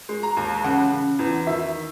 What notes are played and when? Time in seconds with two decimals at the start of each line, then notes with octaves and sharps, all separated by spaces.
0.09 G#3
0.23 A#5
0.37 D#2
0.64 C#3 F#5
0.92 C#3
1.19 E2
1.47 D#3 E5